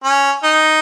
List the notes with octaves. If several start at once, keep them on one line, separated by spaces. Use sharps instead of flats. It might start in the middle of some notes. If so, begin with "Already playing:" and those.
C#4
D#4